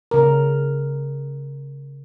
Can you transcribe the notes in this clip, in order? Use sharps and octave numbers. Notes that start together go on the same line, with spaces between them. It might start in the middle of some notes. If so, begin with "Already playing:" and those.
C#3 A#4